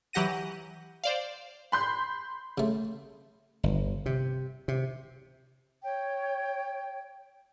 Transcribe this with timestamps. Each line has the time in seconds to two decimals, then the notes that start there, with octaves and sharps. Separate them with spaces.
0.13 E3 F#3 G4 F#5 A#6 D#7
1.04 C5 D5 F5
1.72 B5 C6 G6
2.58 C#3 A3
3.63 G1
4.06 C3
4.68 C3
5.83 C#5 G5